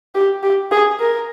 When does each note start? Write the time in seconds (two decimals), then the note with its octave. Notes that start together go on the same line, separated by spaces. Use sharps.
0.15 G4
0.43 G4
0.71 G#4
1.00 A#4